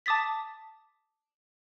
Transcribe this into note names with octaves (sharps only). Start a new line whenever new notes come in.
A5 D6 D#6 A6 B6